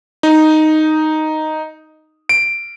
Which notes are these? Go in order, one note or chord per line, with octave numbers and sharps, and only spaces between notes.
D#4
D7